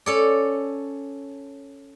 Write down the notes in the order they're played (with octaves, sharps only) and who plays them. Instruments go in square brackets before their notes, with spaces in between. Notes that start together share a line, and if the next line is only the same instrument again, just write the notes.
[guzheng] C#4 A4 D5